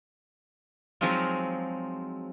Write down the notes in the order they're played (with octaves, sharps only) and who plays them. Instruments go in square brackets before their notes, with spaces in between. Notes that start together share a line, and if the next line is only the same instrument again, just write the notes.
[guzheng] F3 F#3 G#3 C4 D#4 F4